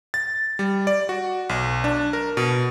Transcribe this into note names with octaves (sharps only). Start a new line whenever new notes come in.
A6
G3
D5
F#4
B1
D4
A#4
B2